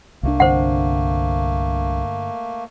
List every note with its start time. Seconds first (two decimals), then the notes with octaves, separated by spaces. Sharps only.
0.23 C2 F3 A3 A#3 D4
0.40 G2 D3 C4 C5 F#5